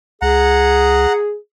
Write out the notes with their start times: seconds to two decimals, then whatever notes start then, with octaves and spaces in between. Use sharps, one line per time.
0.22 C#2 G#4 F#5 A#5